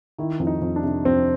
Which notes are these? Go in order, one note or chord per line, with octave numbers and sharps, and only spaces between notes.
D#3 E4
F2
D#4
F2
D4
C3
F2 C4